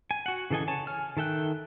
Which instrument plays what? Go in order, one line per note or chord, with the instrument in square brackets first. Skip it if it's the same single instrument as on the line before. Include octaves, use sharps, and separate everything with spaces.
[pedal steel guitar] G#5
F#4 F#5
C#3 E3 A4 D#5 G#5
C#5 G#5 A5
G#5 F6
D#3 A4 E5 G5 F#6